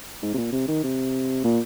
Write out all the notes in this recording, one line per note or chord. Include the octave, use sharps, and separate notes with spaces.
G#2
C3
A#2
C3
D#3
C3
A#2